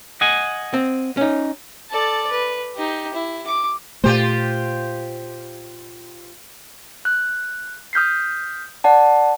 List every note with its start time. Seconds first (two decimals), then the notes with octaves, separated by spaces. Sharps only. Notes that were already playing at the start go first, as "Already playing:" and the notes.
0.21 D#5 F#5 G#5
0.74 C4
1.17 C#4 D#4
1.90 A4 D5
2.31 B4
2.76 D#4 G4
3.14 E4
3.47 D6
4.04 A#2 A3 F4 G4 C5
7.05 F#6
7.93 D#6 F6 G6 B6 C7
8.84 D5 F#5 A5